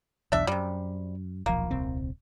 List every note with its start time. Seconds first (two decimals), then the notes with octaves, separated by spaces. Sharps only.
0.32 B1 E2 D4 E5
0.47 F#2 C3 G3
1.46 D#1 B1 F3 A#3
1.71 D#1 C2 C4